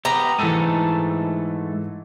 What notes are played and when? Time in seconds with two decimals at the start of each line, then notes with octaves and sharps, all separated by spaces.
0.05 B3 G4 A#5
0.39 G#2 E3 A3 A4 D#7